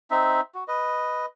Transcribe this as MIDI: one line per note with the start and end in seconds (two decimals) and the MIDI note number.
0.11 0.41 60
0.11 0.41 63
0.11 0.41 76
0.55 0.64 66
0.68 1.26 71
0.68 1.26 75